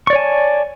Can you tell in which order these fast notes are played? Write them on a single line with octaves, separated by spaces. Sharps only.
C#6 D5 C#5 G#5 A5